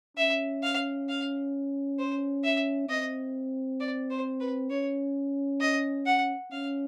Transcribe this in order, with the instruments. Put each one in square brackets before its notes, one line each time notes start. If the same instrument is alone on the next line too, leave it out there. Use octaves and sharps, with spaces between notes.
[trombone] C#4 [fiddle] E5
[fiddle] F5
F5
C5
E5
[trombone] C4 [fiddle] D#5
[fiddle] D5
C5
B4
[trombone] C#4 [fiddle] C#5
[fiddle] D#5
F#5
[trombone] C#4 [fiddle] F5